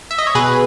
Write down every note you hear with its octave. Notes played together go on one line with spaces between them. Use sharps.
E5
D#5
C#5
B2 G#4 B4